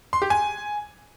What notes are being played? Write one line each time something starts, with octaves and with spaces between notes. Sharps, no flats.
C6
G4
G#5